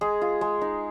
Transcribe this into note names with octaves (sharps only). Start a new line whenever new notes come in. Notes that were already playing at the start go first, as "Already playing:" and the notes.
G#3 G#4
F4
G#3
D#4